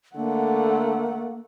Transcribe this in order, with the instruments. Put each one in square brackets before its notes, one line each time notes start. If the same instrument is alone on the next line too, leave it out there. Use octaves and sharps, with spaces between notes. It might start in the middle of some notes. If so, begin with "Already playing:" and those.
[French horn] D3 [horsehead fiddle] A3 F#5 [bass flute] A#3